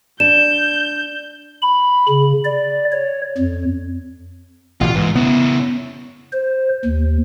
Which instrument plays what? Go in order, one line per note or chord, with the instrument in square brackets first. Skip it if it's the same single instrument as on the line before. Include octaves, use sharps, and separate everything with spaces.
[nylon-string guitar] D4 [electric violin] G6 [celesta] E7
[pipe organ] B5
C#3
D5
C#5
F2
[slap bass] A1 B2 D3 [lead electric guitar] F4
[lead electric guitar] G#2 [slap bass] E3
[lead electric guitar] C#3 E4 [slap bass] B3
[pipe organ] C5
D#2